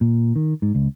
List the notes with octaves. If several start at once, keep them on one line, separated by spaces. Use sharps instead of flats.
A#2
D#3
G#2
C#2